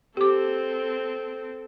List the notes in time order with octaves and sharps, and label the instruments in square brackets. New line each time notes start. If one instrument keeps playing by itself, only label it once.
[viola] C4 A4 [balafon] G4 D6